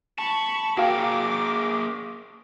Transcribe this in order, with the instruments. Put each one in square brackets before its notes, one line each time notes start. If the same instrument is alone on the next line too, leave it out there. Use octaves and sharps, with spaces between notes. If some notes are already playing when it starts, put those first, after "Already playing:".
[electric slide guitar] A5 [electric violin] B5 C#6
[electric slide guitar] A#3 G#4 A#4 [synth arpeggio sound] F#4 F5 G5 [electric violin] D6